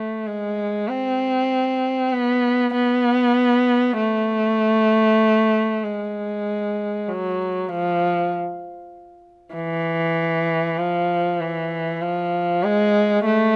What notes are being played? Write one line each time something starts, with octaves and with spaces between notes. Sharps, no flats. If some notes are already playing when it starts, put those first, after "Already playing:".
Already playing: A3
G#3
C4
B3
B3
A3
G#3
F#3
F3
E3
F3
E3
F3
G#3
A3